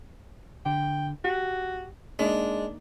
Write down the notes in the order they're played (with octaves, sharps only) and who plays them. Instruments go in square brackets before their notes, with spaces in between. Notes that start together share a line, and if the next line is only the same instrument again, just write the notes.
[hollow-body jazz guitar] D3 [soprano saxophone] G5
[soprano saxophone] F#4 [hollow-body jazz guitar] G4
[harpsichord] G#3 [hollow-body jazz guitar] A#3 D#4 E5 [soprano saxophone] D4